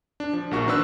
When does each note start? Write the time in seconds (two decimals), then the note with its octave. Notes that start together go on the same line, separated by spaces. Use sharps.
0.20 D4
0.33 F3
0.51 A#1 A#3 F#4 C#6
0.66 D#3 C4 D4 B4 E6 F#6